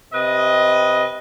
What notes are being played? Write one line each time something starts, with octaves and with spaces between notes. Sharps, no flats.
C3 B4 D#5